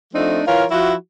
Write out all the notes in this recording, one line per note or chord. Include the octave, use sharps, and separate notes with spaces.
F3 A3 C4 D4 D#4
E3 F4 A#4 C#5 F5
F3 E4 F#4